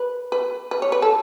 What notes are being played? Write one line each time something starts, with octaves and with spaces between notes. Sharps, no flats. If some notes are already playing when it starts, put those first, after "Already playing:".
Already playing: B4
B4
B4
C#5
B4
A4